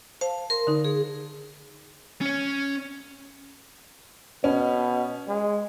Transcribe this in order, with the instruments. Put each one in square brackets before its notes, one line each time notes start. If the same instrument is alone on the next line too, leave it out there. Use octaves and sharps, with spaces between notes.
[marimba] C5 [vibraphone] F5 A5
[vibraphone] A#4 C6
[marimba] D3 D#4
[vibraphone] G#4
[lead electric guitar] C#4 C#5
[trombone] B2 [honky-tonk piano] C#4
[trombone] G#3